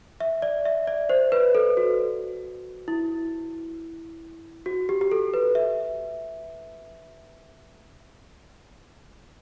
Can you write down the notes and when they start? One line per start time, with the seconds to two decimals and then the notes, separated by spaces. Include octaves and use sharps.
0.20 E5
0.42 D5
0.65 E5
0.87 D5
1.09 C5
1.32 B4
1.55 A4
1.77 F#4
2.88 E4
4.66 F#4
4.89 G4
5.01 G4
5.11 A4
5.34 B4
5.55 E5